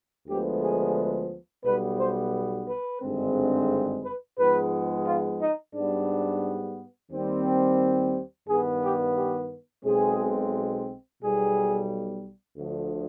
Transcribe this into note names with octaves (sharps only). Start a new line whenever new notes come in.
D2 D3 F3 G#3 B3 G4
G#4
B1 B2 G3 B3 B4
C5
B4
G#1 G2 D3 G#3 C4
B4
G#2 F3 G#3 B3 B4
F4
D#4
G#2 G3 B3 D4
D#2 D#3 G3 C4
G2 D#3 B3 G#4
G4
G4
B1 B2 G#3 C4 G#4
B1 B2 G3 G#4
D2 D3 F3